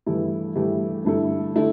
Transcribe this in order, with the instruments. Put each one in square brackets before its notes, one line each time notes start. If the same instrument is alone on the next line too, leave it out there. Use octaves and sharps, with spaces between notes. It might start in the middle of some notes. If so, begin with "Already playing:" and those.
[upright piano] G2 E3 A3 E4 G4
G2 E3 A3 E4 G4
G2 D3 A3 E4 A4
D3 A3 E4 A4